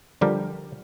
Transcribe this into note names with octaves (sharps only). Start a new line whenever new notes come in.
D3 F3 G3 G4 A#4